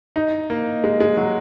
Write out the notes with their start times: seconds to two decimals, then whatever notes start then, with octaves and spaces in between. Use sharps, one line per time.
0.16 D#4
0.50 A#3
0.84 G#3
1.00 G#3
1.17 F#3